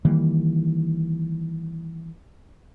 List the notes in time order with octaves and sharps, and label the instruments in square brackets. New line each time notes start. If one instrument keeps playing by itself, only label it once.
[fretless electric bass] D#3 E3 G3 A#3